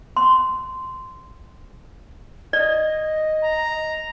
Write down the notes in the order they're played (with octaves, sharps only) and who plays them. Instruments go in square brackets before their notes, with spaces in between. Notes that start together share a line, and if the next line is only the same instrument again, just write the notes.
[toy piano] C6
[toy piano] D5 [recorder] D#5
[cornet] A#5